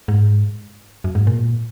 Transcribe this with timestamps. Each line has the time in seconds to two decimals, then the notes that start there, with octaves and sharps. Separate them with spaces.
0.08 G#2
1.04 F#2
1.15 G#2
1.27 A#2